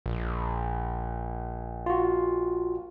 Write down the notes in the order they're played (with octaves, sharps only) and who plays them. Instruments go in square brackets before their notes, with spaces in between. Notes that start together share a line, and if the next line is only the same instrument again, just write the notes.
[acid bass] A#1
[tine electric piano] F4 F#4